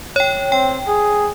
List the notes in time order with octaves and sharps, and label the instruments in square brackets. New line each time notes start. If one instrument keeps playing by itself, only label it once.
[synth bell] C#5 G5
[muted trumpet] C4 [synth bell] G5
[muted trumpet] G#4